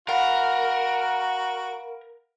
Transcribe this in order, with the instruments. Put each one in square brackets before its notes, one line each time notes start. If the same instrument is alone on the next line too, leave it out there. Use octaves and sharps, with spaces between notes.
[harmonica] F#4 [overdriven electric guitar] A#4 [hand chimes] F5 F#5 B5